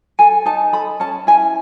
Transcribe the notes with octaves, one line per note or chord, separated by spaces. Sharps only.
A4 G#5
D#4 A5
A4 B5
C#4 A5
E4 G#5